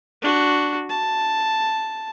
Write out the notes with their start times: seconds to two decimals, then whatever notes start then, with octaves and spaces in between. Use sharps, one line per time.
0.22 D4 F#4
0.90 A5